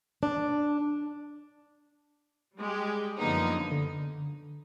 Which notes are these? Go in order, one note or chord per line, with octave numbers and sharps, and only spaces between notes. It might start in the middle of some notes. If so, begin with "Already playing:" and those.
D4
G3 G#3 G4
F#2 D3 F3 A#3 B3 D#4
D3